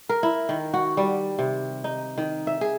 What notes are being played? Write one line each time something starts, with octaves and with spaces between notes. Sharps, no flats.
A#4
E4
D#3
F#4
G3
C3
D#4
D#3
E5
G#4